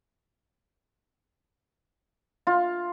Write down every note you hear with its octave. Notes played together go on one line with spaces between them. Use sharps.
F4